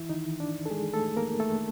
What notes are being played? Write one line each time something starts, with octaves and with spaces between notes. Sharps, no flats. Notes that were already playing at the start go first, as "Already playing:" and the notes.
Already playing: E3 E4
D#3 D#4
D4
A4
G#3 G#4
A3 A4
A#3 A#4
A3 A4